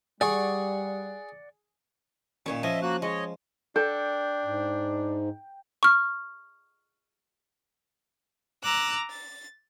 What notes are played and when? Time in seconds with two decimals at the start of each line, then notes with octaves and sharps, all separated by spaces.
0.21 G3 G#4 D5 F#5 C#6
2.46 A#2 D#3 C#4 C#5
2.63 F3 C#4 D#5 E5 G#5
2.82 A#3 F#4 F#6
3.02 G#3 C#5 D#5
3.76 D4 A4 G5
4.45 G#2
5.83 C#6 F6
8.63 A#5 D6 E6 F#6
9.11 A6